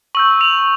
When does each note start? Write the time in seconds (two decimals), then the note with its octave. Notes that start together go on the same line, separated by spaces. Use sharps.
0.15 C#6 E6 G6 F#7
0.41 F7